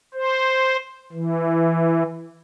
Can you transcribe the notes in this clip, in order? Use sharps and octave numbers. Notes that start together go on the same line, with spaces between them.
C5
E3